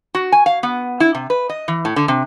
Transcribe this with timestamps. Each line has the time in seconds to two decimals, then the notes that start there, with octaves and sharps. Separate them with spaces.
0.15 F#4
0.32 G#5
0.46 F5
0.63 B3
1.00 E4
1.15 C3
1.30 B4
1.49 D#5
1.68 E3
1.85 A2
1.96 D3
2.08 C3